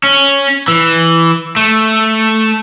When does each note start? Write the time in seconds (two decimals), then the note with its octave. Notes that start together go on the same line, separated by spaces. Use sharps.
0.03 C#4
0.68 E3
1.56 A3